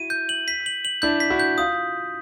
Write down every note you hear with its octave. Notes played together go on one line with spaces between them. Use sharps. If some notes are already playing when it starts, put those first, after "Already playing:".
Already playing: E4 F#4 D#7
G6
F#7
B6
F#7
F#7
D4 E4 G6
B6
E4 F#4
G6
F4 D#6